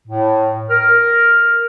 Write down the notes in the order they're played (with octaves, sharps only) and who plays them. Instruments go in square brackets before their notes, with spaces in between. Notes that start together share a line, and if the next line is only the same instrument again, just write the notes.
[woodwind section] A2
[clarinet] A#4 [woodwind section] F6